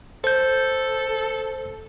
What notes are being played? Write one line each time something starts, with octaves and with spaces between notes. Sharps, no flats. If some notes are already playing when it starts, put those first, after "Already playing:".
A4 C5 G6